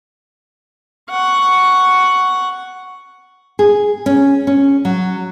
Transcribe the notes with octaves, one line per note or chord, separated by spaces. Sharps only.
F#5 C#6
G#4
C#4
C#4
F#3